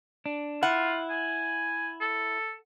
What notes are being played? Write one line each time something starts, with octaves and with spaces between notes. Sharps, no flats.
D4
E4 F4 F#5
G#5
A4